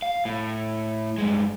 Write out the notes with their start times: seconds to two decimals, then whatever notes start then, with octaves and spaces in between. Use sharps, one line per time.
0.02 F5
0.25 A2
1.18 G2 G#3